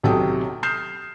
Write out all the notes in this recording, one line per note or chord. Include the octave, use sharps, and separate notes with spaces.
B1 C3 F#3 A4 G5 D#6
D#6 F6 G6 C7 E7